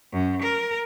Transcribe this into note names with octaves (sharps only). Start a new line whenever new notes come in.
F#2
A#4